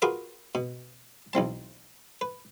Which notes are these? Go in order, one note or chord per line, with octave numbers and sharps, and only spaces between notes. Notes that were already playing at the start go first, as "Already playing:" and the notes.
F4 F#4 G#4 A#4 B4 D6
B2
B1 E2 C4 A5
B4